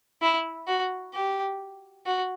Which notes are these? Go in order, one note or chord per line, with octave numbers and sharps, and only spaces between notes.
E4
F#4
G4
F#4